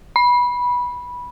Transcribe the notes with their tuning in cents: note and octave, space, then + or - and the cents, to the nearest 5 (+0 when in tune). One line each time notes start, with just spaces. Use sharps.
B5 -15